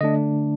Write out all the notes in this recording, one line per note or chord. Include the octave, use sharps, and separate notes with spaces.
D3 A3 D4 D#5